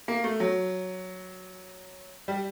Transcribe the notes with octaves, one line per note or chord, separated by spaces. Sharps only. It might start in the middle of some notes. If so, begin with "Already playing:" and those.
A#3
A3
F#3
G3